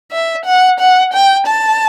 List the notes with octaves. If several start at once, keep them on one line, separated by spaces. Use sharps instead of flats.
E5
F#5
F#5
G5
A5